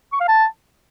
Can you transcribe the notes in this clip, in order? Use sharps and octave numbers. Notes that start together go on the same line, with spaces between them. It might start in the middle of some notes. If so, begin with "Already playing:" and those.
C#6
F5
A5